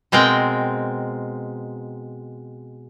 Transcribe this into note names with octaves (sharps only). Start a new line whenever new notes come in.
B2 G#3 C4 A#4 G5